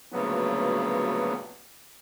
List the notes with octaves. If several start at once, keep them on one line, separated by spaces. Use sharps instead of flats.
D2 G2 A#2 C#3 F#3 B3